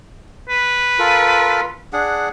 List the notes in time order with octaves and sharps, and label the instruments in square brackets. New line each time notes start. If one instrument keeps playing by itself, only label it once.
[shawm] B4
[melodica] F4 A4 A#4
D4 G#4 F#5